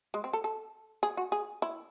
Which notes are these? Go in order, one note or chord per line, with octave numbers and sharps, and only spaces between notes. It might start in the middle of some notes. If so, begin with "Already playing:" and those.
G#3
C4
A4
A4
G#4
F#4
G#4
E4